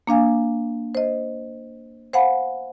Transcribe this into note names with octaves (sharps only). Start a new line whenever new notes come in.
A#3 D4 F5 G#5
C5 D#5
C5 F5 F#5 G#5 B5